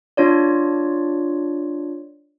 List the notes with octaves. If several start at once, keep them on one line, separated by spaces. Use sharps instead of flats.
D4 F4 C#5 D5